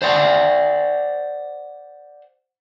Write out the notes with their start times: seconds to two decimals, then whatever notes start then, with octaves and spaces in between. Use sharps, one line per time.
0.02 C5 D5 F#5 C6